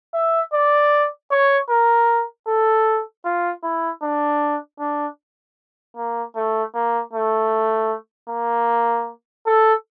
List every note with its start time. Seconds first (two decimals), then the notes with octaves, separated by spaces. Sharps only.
0.14 E5
0.54 D5
1.31 C#5
1.70 A#4
2.48 A4
3.25 F4
3.63 E4
4.03 D4
4.80 D4
5.96 A#3
6.36 A3
6.74 A#3
7.13 A3
8.29 A#3
9.46 A4